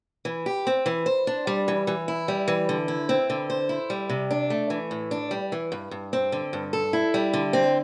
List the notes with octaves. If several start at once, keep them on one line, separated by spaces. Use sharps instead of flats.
E3
G4
C4
E3
C5
D4
G3
E3
E3
E4
G3
E3
D3
E4
C4
D3
C5
E4
G3
C3
D4
A3
E3
A2
D4
G3
E3
G2
G2
C4
D3
G2
A4
E4
G3
D3
C4